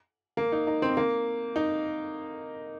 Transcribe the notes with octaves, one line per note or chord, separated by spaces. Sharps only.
A#3
D#4
D#4
C4
A#3
D#4